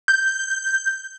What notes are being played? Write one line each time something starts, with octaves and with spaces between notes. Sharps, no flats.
G6